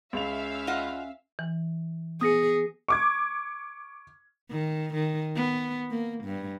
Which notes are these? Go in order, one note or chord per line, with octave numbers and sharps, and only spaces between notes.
C#2 C#4 E5 F5 F7
F4 D#5 F#5
E3
B3 G#4 D#6 A#6 C#7
C#6 D6 G#6
D#3
D#3
B3
A#3
G2